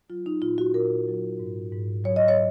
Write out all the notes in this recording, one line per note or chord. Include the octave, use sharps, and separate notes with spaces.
F#3 F4
D#4
A#2 F4
F#4
A#2 A#4
F#3
G#2
G#2
F#3 C#5
D#5
C#5